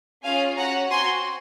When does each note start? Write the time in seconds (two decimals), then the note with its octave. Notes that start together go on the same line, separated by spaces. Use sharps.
0.24 C#4 F4 G#4 F5 G#5
0.57 C#4 F#4 F#5 A#5
0.90 C4 F#4 G#5 C6